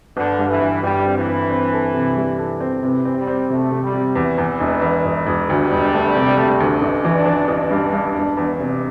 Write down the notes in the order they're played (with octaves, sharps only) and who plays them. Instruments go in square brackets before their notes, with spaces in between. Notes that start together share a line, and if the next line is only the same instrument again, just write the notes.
[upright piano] G1 [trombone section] D3
[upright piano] G2
[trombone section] E3
[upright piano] G1
[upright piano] G1 [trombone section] G3
[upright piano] C4
[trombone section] E3
[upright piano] G1
C4
A4
C3
G3
A4
C4
[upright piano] C3 [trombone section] E3
[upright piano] C4
[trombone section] G3
[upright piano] C4
[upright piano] C3 [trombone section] A3
[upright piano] C3
[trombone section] G3
[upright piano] C3
[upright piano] E2 [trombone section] E3
[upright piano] E2
E1
E2
E1
E1
[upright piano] D2 [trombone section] G3
[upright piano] E1
A3
C3
A3
D2
[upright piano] A1 [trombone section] A3
[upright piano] E3
[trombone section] D4
[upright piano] E3
[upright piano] A1 [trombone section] D4
[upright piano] G2
G2
E1
E2
C3